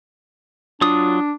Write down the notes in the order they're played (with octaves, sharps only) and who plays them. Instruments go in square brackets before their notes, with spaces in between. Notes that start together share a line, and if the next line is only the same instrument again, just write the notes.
[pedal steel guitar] F#3 F4 D#6 [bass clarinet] D4